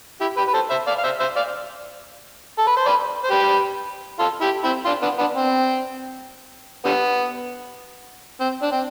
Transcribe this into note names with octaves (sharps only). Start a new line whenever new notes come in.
E4 G4
G4 B4
B4
A4 C5
C5 E5
D5 F5
F5
C5 E5
C5 E5
D5 F5
A4
B4
C5
B4 D5
C5
G4 B4
F4 A4
E4 G4
C4 E4
D4 F4
B3 D4
B3 D4
C4
D3 G3 B3
C4
D4
C4